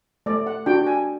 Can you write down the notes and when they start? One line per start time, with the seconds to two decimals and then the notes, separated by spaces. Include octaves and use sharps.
0.26 A3 D5
0.47 F#5
0.66 D4 F#4 G5
0.87 G#5